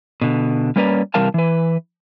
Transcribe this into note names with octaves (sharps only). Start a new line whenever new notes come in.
B2 D3
G3 A#3 C#4 B4 D5 A#5
C3 E3 G3 A#4 F5 A5
E3 B4